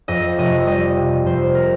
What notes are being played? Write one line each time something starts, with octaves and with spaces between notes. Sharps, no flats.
F2 D#5
F1 D#5
G3 D#5
C3
F2 C5
A#4